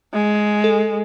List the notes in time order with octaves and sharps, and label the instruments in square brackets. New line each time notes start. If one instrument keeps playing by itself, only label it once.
[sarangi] G#3
[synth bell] A4